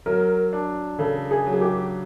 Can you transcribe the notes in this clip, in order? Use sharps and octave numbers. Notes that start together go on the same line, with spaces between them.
F#3 A#4
D4
C#3 A4
G#4
F#3
G#4
G4